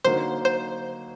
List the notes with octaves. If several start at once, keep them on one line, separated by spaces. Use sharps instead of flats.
D3 F#3 A#3 D#4 C5
C5